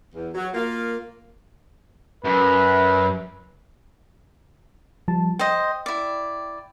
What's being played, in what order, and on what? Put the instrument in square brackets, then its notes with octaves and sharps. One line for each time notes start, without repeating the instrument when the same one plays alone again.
[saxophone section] E2
F#3
A#3 F4
[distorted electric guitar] F#2 [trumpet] B4
[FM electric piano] F3 G3 A5
[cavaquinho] C5 D#5 [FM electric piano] G5
[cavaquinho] E4 D5